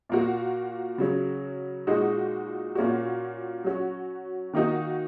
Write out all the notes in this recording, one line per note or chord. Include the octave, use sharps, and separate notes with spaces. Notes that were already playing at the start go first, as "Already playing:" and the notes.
A#2 A#3 F#4
C#3 F#3 C#4
A#2 G#3 D#4 F#4
A#2 A#3 C#4 F#4
F#3 C#4 F#4
D#3 A#3 D#4 F#4